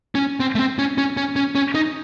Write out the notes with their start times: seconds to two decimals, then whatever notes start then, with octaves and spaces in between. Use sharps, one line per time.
0.15 C#4
0.40 C4
0.55 A3
0.59 C4
0.79 C#4
0.98 C#4
1.17 C#4
1.36 C#4
1.55 C#4
1.75 D#4